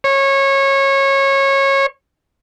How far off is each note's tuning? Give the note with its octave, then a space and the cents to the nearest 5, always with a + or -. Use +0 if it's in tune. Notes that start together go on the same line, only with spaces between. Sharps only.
C#5 -20